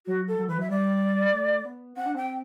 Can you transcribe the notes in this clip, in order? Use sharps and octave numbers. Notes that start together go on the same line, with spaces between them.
F#3 F#4
A4
F#3
E3 B4
F#3 E5
G3 D5
A3
B3
C4 F#5
D4
C4 G5